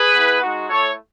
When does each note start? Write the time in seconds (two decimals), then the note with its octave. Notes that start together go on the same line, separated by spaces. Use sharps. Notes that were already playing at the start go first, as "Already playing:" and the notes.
Already playing: G#4 B4
0.13 B3 E4
0.41 G#3 D#4 F#4
0.70 A3 E4 A4 C#5